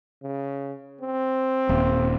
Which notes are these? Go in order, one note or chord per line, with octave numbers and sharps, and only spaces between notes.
C#3
C4
D#1